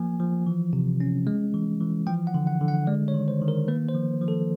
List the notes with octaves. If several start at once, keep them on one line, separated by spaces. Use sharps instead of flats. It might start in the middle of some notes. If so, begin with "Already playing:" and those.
Already playing: F3 A#3 G#5
F3
E3
C3
C#4
G#3
E3
E3
F3 G5
F#5
D3
F#5
D3
F#5
G#3 D5
C#5
D#3
C5
D#3
A#4
A#3 B4
C5
F3
F3
A4